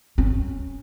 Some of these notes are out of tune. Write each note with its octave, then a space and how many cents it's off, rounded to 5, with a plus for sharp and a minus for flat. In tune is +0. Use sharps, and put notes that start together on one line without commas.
C#4 -15